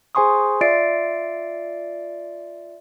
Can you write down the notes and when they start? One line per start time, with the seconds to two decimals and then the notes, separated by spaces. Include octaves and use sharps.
0.15 G#4 C5 G#5 C6 C#6 D#6
0.61 F4 D5 E5 A6 C7 D7